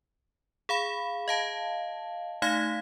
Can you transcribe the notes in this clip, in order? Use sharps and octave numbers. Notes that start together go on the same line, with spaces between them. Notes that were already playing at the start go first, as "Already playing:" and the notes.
G#4 F5 B5
D#5 F5 A5
A3 D#4 F5 G#6 B6